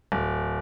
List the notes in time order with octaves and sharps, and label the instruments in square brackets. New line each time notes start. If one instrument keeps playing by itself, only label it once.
[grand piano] D1